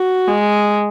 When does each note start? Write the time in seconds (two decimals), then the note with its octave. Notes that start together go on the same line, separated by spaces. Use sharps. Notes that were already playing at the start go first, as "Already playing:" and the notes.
Already playing: F#4
0.27 G#3